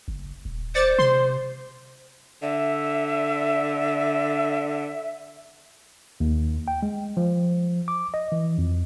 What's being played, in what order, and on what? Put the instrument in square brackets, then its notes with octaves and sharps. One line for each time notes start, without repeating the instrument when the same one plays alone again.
[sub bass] F#1
D#1
[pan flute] C5 [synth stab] D5 A6 C#7
[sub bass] C3 [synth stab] C6
[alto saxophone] D3 [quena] E5
[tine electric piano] D#2
G5
G#3
F3
D6
D#5
E3
F2